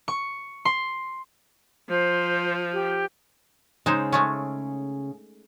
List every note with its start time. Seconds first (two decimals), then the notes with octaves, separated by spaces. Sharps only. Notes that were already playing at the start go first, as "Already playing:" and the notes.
0.08 C#6
0.65 C6
1.89 F3 C5
2.73 G4
3.86 C#3 G#3 D#4 C5
4.12 G#3 A3 C#4